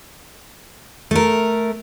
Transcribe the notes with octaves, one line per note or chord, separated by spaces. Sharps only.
A3 A#4